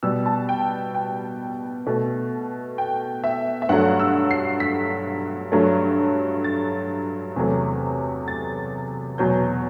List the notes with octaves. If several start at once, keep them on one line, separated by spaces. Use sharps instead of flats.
B2 G3 E6
A5
G5
G5
B2 A3
G5
E5
E5
G2 F#3 A3 F#5
E6
C7
B6
G2 F#3 A3
A6
E2 C3 F#3 A3
A6
E2 B2 F#3 G6